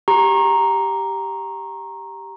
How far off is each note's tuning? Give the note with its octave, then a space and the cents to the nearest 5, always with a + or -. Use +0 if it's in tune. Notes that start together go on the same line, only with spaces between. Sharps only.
G4 +0 A#5 +0 C#6 -40